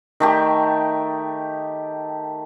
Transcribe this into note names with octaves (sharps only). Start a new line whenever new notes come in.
D#3 A3 G4